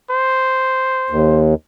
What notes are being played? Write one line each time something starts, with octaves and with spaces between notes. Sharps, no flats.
C5
D#2